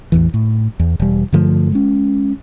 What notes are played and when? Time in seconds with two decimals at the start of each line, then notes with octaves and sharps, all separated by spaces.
0.12 A1 E2 E3
0.34 A2
0.80 E2
1.00 E1 G3
1.33 G2 D3 F3 A3
1.72 G#3 C#4